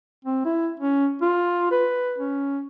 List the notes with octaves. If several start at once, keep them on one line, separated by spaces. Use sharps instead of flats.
C4
E4
C#4
F4
B4
C#4